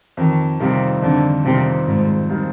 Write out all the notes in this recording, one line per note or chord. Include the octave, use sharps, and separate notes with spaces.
F2 D#3
C3 D#3 G3 C4 F4
F2 D3
C3 D#3 G3 C4 F4
F2 G#2
D#3 G3 C4 F4